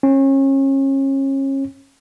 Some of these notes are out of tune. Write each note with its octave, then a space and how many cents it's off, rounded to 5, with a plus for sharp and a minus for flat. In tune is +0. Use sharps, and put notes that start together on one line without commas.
C#4 -35